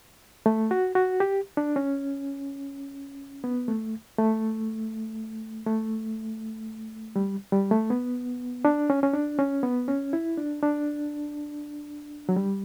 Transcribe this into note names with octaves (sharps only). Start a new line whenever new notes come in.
A3
F#4
F#4
G4
D4
C#4
B3
A3
A3
A3
G3
G3
A3
B3
D4
C#4
C#4
D4
C#4
B3
C#4
E4
D4
D4
F#3
G3